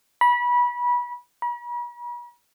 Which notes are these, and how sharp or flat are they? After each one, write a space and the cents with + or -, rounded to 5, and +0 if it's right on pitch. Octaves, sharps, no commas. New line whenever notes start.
B5 -25
B5 -45